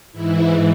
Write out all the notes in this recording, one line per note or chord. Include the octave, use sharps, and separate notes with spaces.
G#2 E3 E4